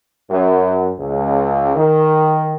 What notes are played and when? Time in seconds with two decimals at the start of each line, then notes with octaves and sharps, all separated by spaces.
0.30 F#2
0.98 C#2
1.75 D#3